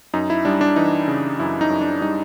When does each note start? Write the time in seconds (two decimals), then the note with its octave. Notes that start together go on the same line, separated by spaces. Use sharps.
0.14 F#2 D#4
0.30 E4
0.45 G3 D4
0.61 D4
0.76 E3 D#4
1.08 C#3
1.39 F#2 E4
1.61 D#4
1.70 F#2
1.81 D4
2.01 G3 D#4